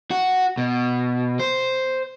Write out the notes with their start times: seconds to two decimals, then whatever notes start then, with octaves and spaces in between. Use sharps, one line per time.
0.11 F#4
0.58 B2
1.39 C5